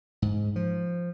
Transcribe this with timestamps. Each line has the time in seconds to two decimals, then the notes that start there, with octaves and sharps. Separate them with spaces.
0.22 G#2
0.56 F3